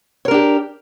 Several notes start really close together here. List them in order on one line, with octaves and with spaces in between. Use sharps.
C#5 A#4 D4 G4